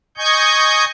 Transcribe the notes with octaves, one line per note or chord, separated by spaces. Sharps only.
D#5 G#5 C#6 G6